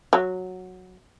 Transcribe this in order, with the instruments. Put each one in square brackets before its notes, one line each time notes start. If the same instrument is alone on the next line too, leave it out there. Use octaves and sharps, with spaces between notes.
[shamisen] F#3